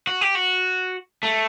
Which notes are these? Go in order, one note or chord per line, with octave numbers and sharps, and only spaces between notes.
F#4
G4
F#4
A3